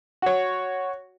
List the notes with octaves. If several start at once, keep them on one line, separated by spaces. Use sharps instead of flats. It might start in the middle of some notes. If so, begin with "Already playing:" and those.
F#4 C#5